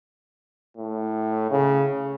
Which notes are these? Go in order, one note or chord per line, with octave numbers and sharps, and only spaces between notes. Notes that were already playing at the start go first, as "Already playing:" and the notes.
A2
C#3